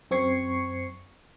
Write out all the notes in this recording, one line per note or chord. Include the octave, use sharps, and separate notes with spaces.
F#2 C4 C#6 G#6 C7 C#7